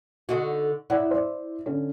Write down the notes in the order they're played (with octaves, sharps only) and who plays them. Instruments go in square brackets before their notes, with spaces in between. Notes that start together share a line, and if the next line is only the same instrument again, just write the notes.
[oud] D3 D#4 F#4
[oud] E4 [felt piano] C#5 D5 F#5
[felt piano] C5 D5
D3 C#4